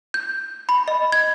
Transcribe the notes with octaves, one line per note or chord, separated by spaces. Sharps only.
G6
B5
D#5
G#6